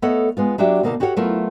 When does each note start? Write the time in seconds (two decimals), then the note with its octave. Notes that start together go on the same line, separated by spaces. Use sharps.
0.02 A3 B3 A4 C#5 D#5 F#5
0.37 G#3 B3 F4
0.58 F#3 D4 F#4 G4 E5
0.83 B2 D3 A#3 D#4 A#4 A5
1.00 F#4 G4 A4 C#5 E5 F#5
1.16 F#3 A3 B3 E4 F4 A#4